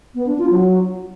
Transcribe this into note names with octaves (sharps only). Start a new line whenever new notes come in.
B3
D4
F4
F#3